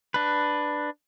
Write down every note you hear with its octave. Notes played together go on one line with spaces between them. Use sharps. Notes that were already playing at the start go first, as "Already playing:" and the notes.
D4 B4